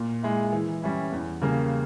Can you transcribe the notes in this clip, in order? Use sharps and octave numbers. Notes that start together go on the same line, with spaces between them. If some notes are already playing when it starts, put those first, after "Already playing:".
Already playing: A#2
G#3 E4
E3
G3 C#4 E4
E2
C#3 G3 A#3